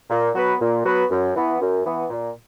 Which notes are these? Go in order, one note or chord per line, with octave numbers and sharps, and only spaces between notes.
A#2
F#3 B3 F#4 B4
A#2
F#3 B3 F#4 B4
F#2
E3 B3
F#2
E3 B3
A#2